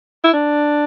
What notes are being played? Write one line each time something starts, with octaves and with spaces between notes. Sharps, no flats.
E4
D4